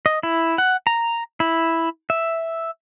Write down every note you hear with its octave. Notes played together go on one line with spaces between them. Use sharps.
D#5
E4
F#5
A#5
E4
E5